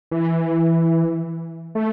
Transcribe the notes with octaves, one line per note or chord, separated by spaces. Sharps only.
E3
A3